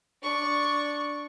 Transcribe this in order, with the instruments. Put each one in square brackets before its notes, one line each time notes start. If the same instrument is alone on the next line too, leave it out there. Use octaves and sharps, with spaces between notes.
[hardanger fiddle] D4 C#6